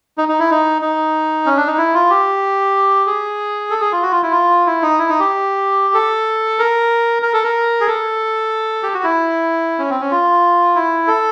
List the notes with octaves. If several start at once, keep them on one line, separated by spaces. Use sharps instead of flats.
D#4
D#4
E4
D#4
D#4
C#4
D4
D#4
E4
F4
G4
G#4
A4
G#4
F4
F#4
F4
E4
F4
E4
D#4
E4
D#4
G4
A4
A#4
A#4
A4
A#4
G#4
A4
G4
F#4
E4
C#4
C4
C#4
F4
E4
A4